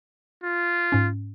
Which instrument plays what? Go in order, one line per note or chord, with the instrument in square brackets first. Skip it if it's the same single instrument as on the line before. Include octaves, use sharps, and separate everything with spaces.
[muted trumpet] F4
[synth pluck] G#2 C#4